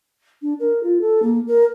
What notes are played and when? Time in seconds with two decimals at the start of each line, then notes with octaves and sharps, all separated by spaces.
0.42 D4
0.59 A#4
0.83 F4
1.00 A4
1.22 A#3
1.47 A#4